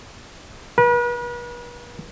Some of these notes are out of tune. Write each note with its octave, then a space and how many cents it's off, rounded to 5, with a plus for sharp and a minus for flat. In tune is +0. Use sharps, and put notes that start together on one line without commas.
B4 -40